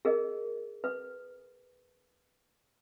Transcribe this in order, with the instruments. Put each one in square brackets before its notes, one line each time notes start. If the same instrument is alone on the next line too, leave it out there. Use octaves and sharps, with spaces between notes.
[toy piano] G#4 A#4 D#5
B4